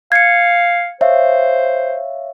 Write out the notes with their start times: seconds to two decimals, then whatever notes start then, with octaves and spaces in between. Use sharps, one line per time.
0.12 F5 G#6 C#7
1.01 C5 C#5 E5 F5